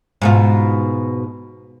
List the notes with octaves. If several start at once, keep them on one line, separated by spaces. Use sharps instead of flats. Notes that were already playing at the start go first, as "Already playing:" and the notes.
G#2 B2 F4